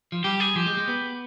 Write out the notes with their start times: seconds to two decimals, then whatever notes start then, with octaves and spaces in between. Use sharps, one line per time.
0.12 F3
0.24 G3 G4
0.40 G#4
0.56 F3 G4
0.66 G#3
0.77 G#3
0.88 B3